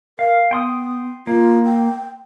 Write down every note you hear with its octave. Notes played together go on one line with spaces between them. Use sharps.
A#4 F5
B3 G5 C6 D#6
A#3 F4
G5